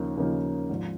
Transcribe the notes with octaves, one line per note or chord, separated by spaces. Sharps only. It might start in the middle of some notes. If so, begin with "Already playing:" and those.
Already playing: D#2 C#3 F3 A#3 D#4
D#2 C#3 F3 A#3 D#4
G#1 G#2 F3